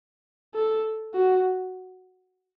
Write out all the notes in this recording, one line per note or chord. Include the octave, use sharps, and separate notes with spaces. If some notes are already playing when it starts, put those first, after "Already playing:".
A4
F#4